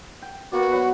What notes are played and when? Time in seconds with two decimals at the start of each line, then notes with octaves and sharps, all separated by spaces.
0.22 G5
0.52 A#3 B3 F#4 D5
0.72 F#3 B4